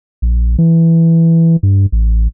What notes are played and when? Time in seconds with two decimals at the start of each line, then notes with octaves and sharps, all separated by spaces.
0.22 A#1
0.58 E3
1.63 G2
1.92 A1